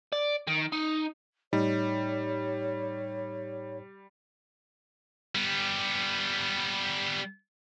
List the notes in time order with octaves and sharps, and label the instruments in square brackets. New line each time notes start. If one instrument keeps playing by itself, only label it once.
[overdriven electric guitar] D5
D#3
D#4
[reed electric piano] A2 D#4 [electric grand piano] G3 [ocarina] C#5
[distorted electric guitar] G3 B3